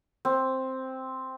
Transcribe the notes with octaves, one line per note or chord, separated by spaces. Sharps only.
C4